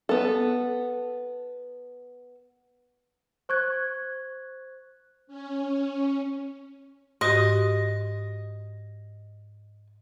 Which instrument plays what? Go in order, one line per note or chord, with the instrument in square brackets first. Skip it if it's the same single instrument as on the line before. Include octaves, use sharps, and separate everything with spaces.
[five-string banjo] B3 A4
[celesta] C5 C#6 F#6 G#6
[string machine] C#4
[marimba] G#2 F#4 G4 [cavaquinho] D#5